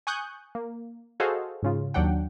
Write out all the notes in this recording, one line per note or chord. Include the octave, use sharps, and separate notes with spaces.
G#5 C#6 D#6 F#6 G6
A#3
F#4 G#4 A4 C5 D#5 F5
G#2 C#3 F4
D#2 F#3 D4 F#5 G5